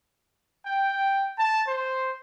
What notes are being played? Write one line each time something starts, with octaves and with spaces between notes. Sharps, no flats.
G5
A5
C5